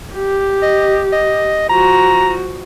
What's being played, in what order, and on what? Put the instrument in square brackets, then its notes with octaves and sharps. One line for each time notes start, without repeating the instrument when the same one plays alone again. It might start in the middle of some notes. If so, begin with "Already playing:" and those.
[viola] G4
[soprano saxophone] D#5
D#5
[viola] F3 F#4 [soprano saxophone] A#5